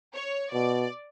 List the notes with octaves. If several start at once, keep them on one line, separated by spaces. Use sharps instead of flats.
C#5
B2 D5